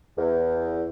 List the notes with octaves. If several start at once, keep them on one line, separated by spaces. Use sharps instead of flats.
E2